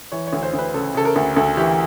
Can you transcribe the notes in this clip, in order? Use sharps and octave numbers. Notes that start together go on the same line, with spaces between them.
E3 C#5
C#5
D2
C5
D2
B4
C#3 A4
C#3 A4
A#4
D2
D2 A4
E3 G4